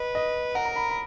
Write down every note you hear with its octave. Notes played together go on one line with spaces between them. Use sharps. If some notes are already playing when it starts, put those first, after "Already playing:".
Already playing: B4 D#5
D#5
A#4 F#5
A#5
B5
B5